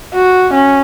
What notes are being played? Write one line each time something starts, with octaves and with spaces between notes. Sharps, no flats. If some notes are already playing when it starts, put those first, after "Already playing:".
F#4
C#4